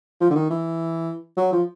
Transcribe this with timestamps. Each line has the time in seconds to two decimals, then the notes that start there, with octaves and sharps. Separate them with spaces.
0.20 F3
0.30 D3
0.35 D#3
0.50 E3
1.37 F#3
1.52 F3